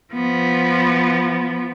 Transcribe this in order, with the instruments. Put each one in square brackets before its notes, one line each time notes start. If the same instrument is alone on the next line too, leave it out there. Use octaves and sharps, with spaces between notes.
[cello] F3 B3